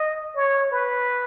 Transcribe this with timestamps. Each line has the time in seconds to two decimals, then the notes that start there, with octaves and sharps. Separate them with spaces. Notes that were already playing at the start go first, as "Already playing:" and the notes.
Already playing: D#5
0.36 C#5
0.72 B4